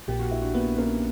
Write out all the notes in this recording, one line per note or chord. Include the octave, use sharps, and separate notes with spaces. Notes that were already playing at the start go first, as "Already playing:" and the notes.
A#1 A#2 A#3 G4
F#4
E4
D4 F#4
A#1 A#2 A#3 B3 D4
A#3 C#4